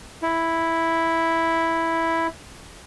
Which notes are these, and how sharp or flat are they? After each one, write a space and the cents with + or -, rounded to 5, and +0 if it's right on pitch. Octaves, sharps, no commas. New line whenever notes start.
E4 +0